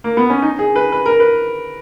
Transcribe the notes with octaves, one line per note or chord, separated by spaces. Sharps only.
A#3
B3
C#4
D#4
G#4
B4
B4
A#4
B4